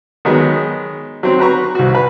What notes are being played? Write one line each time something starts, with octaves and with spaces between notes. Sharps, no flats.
D#3 F#3 G#3 B3
F#3 C4
F#4 B4 A#5 C#6
C2 F#4
B4